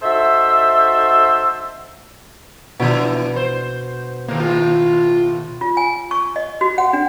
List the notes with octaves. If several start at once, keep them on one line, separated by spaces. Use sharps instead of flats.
D#4 F#4 A4 C5 E5
B2 E3 D4 E4
C5
D#2 A2 A#3
F4
F4
G#5
C#6
D#5
F#4
F#5
D4